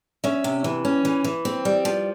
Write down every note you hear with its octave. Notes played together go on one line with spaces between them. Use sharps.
C#4 E5
C3
E3
C#4
E3
E3
C4
G3
F3